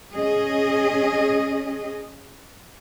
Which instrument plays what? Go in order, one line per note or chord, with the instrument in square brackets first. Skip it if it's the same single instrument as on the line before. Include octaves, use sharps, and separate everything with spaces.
[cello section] C#4 G#4 D#5